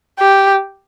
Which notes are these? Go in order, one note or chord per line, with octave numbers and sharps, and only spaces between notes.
G4